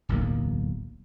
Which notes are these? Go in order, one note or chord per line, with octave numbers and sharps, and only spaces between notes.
D1 B1 E2 A#3